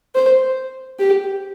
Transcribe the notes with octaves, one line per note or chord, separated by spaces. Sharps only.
C5
G4